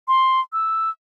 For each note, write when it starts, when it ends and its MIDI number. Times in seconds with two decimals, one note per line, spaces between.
0.08 0.40 84
0.53 0.90 88